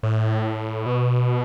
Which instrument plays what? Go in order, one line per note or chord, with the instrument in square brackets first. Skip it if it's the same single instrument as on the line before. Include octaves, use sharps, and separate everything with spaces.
[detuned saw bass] A2
B2